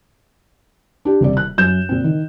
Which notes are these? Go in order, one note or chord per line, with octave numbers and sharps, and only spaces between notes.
D4 G4
D#1 C3 D5
F#6
F#2 G6 E7
A#2 C4
D#3